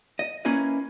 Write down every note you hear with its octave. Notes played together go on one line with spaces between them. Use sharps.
D#5
A#3 C#4 E4 B4 D#5